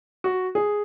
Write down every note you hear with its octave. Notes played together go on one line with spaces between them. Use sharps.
F#4
G#4